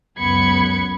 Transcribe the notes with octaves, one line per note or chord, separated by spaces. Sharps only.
C#2 F#2 B3 B5 G#6 C#7